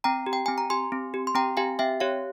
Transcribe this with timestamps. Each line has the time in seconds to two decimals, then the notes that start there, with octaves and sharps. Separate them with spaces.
0.04 C4 G5 A#5
0.26 G4
0.33 G5
0.46 C4 G#5
0.58 A#5
0.70 G4 G#5 C6
0.92 C4
1.14 G4
1.27 C6
1.35 C4 G5 A#5
1.57 G4 F5 G#5
1.79 C4 E5 G5
2.00 G4 C#5 F5